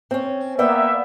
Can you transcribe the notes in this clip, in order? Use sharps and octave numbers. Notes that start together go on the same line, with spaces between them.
C4 C#4
A#3 B3 D5 E5 F#5 G5